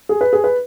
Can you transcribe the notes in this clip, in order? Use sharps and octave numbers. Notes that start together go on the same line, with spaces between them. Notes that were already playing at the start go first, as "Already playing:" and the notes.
G#4
B4
G#4
B4